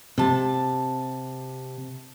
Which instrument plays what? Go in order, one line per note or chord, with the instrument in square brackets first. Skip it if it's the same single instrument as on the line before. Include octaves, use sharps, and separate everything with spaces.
[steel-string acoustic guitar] C3 A5